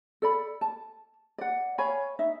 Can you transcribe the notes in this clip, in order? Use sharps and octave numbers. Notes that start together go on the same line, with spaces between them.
A4 D5 B5
A5
D5 F#5
C#5 F5 G#5 B5
D#4 E5